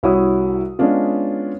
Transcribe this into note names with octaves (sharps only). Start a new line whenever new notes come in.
C2 E4 F#4 C#5 D#6
G#3 B3 C#4 D4 F4